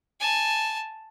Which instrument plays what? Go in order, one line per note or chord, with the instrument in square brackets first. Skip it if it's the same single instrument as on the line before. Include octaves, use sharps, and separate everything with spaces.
[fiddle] G#5 A5